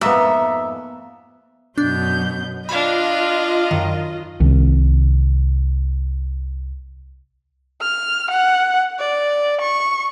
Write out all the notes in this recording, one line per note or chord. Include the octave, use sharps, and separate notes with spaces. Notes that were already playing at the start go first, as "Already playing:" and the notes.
F2 G#2 A#3 B3 E5
F#2 B2 D4 G6
D4 F4 D#5 F5 B5
F#2 D#3
C2 D#3 C#4
F6
F#5
D5
C#6